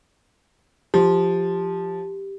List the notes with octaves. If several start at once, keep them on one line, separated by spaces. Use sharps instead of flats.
F3 G4